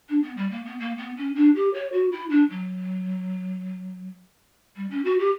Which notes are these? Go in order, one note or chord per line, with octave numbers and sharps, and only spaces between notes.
D4
B3
G3
A#3
B3
A#3
B3
C#4
D4
G4
C#5
F#4
E4
D4
F#3
G3
C#4
F#4
G4